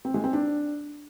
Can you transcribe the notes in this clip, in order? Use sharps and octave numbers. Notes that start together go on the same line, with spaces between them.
C4
G#3
C4
D4